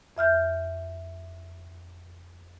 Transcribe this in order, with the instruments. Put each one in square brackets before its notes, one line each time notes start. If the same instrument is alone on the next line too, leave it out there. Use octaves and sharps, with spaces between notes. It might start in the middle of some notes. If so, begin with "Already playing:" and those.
[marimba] F2 E5 F6 G6